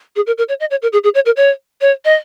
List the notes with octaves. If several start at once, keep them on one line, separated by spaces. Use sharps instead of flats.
G#4
A#4
A#4
C#5
D#5
C#5
A#4
G#4
G#4
C#5
A#4
C#5
C#5
D#5